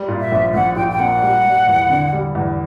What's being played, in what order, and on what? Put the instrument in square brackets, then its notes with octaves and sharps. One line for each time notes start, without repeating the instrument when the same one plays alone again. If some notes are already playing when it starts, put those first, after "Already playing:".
Already playing: [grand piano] G3
A#2
[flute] E5
[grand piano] A#1
[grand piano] A#1 [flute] F#5
[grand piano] A#2 [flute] G5
[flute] G5
[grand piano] A#3 [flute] F#5
[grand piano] G3
G3
E2
D3
G3
E2